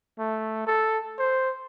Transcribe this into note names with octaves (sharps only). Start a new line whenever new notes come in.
A3
A4
C5